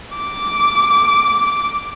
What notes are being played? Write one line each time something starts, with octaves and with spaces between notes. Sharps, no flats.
D6